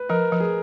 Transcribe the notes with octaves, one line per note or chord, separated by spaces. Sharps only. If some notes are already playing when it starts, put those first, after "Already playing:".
Already playing: B4
F3 A#4
F3
G#4